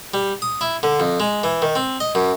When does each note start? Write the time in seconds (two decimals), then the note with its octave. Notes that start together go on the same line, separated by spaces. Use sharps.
0.14 G3
0.42 D#6
0.61 E4
0.83 D3
1.00 F2
1.20 G#3
1.44 E3
1.62 D#3
1.75 C4
2.00 D#5
2.15 F#2